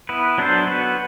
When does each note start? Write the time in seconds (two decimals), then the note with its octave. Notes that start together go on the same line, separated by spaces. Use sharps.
0.09 B3 E4 B4
0.38 F#3 B3 D4 A4 C5
0.67 B3 F#4 B4